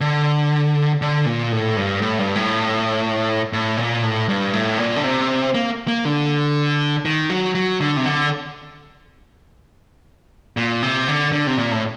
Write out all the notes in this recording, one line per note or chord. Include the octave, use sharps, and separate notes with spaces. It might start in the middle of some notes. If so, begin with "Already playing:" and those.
D3
D3
A#2
A2
G2
A2
G2
A2
A2
A#2
A2
G2
A2
A#2
D3
C3
A#3
A#3
D3
D#3
F#3
F#3
D3
C3
D3
A#2
C3
D3
D3
C3
A#2
A2